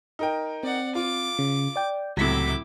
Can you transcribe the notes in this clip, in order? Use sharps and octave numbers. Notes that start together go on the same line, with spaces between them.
D#4 A#4 G5
C4 D5 F#5
F4 D6
C#3
D5 G5
C#2 A2 C3 F#3 E4 D6 B6